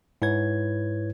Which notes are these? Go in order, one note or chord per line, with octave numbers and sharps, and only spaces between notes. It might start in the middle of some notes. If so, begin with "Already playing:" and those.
G#2 E4 B4 C#5 G#6